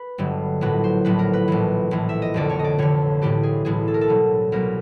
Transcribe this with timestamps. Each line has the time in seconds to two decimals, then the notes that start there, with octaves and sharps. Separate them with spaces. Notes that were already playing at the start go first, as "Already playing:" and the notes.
Already playing: B4
0.18 G1 G2 D3 F#3
0.61 A#1 A2 F#3 B4
0.84 C5
1.05 A#1 A2 F#3 B4
1.19 A#4
1.33 B4
1.48 A#1 A2 E3
1.91 A#1 A2 E3
2.09 E5
2.22 D#5
2.34 F1 F2 D3 D5
2.50 C#5
2.59 D#5
2.64 D5
2.79 F1 F2 D3 C#5
3.22 B1 A2 E3 G4
3.43 G#4
3.65 B1 A2 E3 G#4
3.88 A4
3.94 A#4
4.01 A4
4.08 C2 B2 F#3
4.52 C2 B2 F#3 A#4